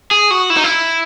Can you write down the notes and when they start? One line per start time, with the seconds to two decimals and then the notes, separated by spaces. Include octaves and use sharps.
0.11 G#4
0.31 F#4
0.50 E4
0.57 D#4
0.64 E4